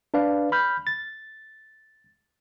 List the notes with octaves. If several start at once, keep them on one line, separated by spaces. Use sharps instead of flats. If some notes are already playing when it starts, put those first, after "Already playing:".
D4 B4 D5 F5
B5 F6 G6
A6